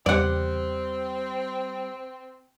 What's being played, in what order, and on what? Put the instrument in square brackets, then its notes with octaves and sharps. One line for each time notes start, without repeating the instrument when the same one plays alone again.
[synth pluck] E2 C#3 E3 [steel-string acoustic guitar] G3 [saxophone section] C4 [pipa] D5 F#5